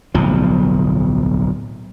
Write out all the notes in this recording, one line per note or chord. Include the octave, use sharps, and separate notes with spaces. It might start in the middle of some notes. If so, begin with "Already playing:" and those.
D1 B1 F3